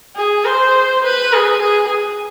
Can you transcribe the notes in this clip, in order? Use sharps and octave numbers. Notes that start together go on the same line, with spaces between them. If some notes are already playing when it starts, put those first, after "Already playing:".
G#4
C5
B4
G#4
G#4